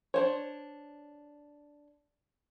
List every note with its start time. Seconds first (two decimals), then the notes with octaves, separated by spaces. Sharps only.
0.14 D4 C5 C#5